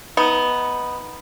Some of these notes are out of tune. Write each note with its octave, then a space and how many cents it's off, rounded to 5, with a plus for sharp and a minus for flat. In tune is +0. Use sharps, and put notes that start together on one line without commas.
B3 +0 D#4 +20